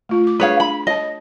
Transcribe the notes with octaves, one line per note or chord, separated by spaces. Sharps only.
A3 F4
D6
D4 G#4 B4 C#5 F5
D4 B5
C#5 D#5 A5